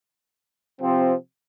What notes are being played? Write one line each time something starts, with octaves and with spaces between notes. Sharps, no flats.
C3 F3 C4